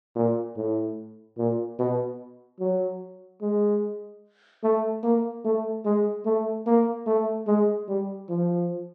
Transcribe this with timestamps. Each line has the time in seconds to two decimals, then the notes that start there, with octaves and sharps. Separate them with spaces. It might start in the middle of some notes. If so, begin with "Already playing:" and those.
0.16 A#2
0.57 A2
1.38 A#2
1.79 B2
2.60 F#3
3.41 G#3
4.64 A3
5.03 A#3
5.45 A3
5.85 G#3
6.26 A3
6.67 A#3
7.07 A3
7.47 G#3
7.89 G3
8.29 F3